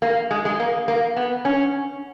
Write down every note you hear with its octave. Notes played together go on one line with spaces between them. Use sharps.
A#3
G#3
G#3
A#3
A#3
B3
C#4